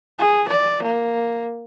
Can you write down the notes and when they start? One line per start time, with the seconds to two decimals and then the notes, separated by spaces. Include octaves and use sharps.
0.19 G#4
0.49 D5
0.83 A#3